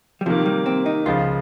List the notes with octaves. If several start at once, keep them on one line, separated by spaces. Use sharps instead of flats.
G3
C3 D#3 F3 A#3
G3
C4
D#4
C#2 C#3 F3 F4